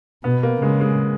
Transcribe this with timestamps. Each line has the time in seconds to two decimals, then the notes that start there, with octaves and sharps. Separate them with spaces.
0.24 B2 B3
0.43 A#3
0.61 C#3 G#3
0.81 G#3